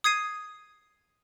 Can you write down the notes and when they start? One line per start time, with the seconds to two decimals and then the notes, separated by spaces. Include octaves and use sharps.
0.04 D#6 G#6 C7 D#7